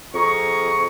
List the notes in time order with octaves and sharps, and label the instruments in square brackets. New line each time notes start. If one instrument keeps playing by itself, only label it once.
[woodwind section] F2 G#4 A#5 C#6